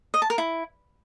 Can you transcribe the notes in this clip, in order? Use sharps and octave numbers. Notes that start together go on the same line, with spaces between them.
D#5
A5
A#4
E4